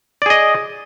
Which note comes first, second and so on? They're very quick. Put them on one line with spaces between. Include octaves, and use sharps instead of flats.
D5 G#4 D#5